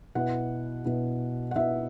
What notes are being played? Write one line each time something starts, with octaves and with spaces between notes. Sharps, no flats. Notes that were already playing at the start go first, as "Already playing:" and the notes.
B2 B3 E4 F#5
B2 B3 E4
F#5
B2 B3 E4 E5